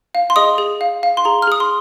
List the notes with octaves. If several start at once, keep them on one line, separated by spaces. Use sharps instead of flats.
F5
C6
G#4 D#5 D#6
G#4
F5
F5
C6
G#4 A#5
F6
G#4 D#6
C6